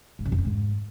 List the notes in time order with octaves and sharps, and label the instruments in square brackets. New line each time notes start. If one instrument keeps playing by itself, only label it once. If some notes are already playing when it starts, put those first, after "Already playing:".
[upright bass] G#2
C#3
F2
D3
G#2